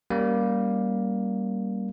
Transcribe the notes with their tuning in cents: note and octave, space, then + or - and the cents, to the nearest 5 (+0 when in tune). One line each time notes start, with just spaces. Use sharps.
G3 +0 A#3 +10 C#4 +15